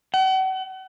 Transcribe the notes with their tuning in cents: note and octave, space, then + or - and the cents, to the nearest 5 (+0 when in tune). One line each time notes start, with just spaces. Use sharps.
F#5 +40